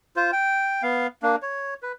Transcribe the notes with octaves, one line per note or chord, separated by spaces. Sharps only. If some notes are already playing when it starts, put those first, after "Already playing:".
F4 C5
G5
B3 F5
A#3 D4
C#5
B4